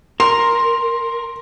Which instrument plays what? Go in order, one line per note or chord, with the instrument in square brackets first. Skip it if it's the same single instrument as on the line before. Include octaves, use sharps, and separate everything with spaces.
[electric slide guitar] A#4 [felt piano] C6